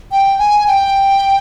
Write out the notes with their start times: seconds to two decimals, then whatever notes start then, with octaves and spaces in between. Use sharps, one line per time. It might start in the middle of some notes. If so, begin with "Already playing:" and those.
0.12 G5
0.39 G#5
0.67 G5